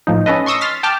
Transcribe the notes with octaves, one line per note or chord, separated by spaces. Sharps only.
A2 F3 D#4
C#4 A4 B4 D#5
C6 C#6 D#6 E6 A#6
C6 F6 A6 B6
G5 A5 D6 F6